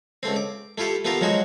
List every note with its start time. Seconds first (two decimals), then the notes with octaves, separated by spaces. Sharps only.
0.23 C#2 A3 C4
0.36 D6
0.78 A3 E4 F4 G4 A4
1.05 A3 B3 F4 G4 A#4
1.21 F3 F#3 G#3 D#4 F#4